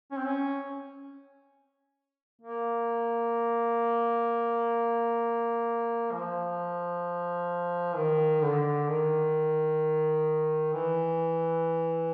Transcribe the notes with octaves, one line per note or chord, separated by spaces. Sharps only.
C#4
C4
C#4
A#3
F3
D#3
D3
D#3
E3